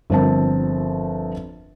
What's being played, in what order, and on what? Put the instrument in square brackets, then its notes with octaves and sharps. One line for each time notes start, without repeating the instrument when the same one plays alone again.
[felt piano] G1 F3 C4 A#4 A5